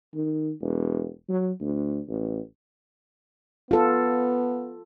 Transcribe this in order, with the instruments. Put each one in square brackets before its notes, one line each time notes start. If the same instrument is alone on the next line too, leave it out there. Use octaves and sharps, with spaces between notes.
[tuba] D#3
E1
F#3
D2
A1
[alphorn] B3 [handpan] F4 A4